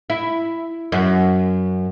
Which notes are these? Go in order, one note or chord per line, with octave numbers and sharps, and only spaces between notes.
E4
F#2